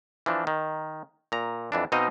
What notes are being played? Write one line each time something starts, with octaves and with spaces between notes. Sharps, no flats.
E3 F3 D4
D#3
A#2 A#5
F2 E3 D4
B2 C4 D#4 D#5 F5